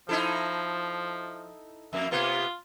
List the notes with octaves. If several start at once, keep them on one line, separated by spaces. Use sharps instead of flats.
F3 D#4 E4 A4
F2 A#3 E5
C3 A#3 B3 F4